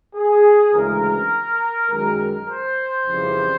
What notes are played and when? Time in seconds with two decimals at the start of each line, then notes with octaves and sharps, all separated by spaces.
0.15 G#4
0.73 D2 C#3 E3 G#3 A#4
1.90 F#2 D#3 G#3 A#4
2.20 A#4
2.49 C5
3.07 F2 C#3 E3 G3